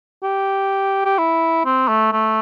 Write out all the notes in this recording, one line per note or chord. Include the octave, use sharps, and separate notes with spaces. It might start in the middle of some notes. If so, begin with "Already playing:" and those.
G4
G4
E4
C4
A3
A3